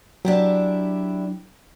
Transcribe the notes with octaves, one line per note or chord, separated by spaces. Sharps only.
F#3 D4 E4 G4